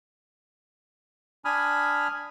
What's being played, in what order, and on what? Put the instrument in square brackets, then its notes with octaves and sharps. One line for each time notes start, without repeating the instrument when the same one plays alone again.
[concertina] D4 G#5 B5 D#6 F6